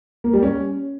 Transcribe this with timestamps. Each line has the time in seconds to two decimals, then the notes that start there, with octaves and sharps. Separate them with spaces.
0.24 A#3
0.33 G3
0.43 C#4